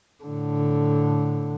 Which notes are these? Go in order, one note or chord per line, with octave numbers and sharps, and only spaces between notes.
A2 D3